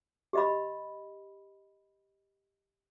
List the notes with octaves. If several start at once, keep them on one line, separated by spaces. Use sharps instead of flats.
G4 D#5 B5